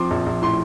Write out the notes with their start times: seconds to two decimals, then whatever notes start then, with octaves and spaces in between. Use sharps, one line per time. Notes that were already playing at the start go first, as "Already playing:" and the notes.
Already playing: F3 C4 C6 D6
0.11 A#1
0.26 A#1
0.42 A2 C6